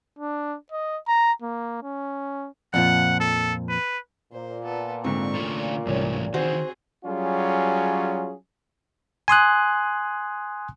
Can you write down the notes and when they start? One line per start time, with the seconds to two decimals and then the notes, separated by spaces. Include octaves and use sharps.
0.19 D4
0.72 D#5
1.08 A#5
1.42 A#3
1.83 C#4
2.74 F2 A#2 F3 F#5
3.20 A4
3.69 B4
4.33 A#2 C5
4.63 B3 A4
5.04 G#2 D3 C4 C#6
5.35 D3 A3 C#4 F4
5.87 C2 G#2 E3 A3 C#4 C#5
6.34 D#3 E3 C4 F#4 G#4 C5 F#5
7.05 F#3 G3 C#4 F4 G#4
9.28 G#5 C6 D#6 F#6